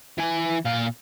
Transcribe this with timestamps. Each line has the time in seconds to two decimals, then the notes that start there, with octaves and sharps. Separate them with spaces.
0.18 E3 G#5
0.66 A#2 F5